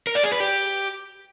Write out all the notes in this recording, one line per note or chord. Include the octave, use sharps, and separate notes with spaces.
A#4
D5
G#4
B4
G4